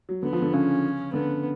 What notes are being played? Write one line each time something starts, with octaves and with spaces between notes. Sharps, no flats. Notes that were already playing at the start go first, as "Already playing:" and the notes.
F#3
D3 B3
F3
D3
C#3 C#4
D3 B3